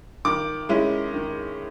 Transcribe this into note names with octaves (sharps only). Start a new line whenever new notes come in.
D#3 D6
G#3 C#4 E4
D#3